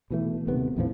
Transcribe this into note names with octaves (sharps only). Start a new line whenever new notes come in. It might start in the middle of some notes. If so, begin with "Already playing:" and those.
B2 E3 A3
D#1 C3 D#3 B3
A#1 F2 A2 F3